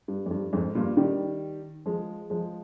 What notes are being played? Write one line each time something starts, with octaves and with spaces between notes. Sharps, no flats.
G2
F2
G2
F2 G#2
G2 A#2
D#3 G3
F3 G#3
F3 G#3